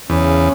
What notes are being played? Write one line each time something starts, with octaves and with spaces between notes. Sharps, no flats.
E2 C#3 C#4